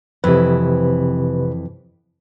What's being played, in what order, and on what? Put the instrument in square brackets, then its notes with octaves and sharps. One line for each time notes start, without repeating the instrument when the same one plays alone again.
[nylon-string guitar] F2 E3 [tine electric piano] C3 B4